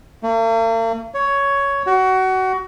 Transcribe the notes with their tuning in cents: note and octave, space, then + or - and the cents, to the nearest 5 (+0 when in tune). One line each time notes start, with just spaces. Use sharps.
A#3 -45
C#5 +10
F#4 +25